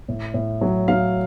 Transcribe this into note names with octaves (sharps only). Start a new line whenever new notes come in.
A2
A2
F#3
F#3 F5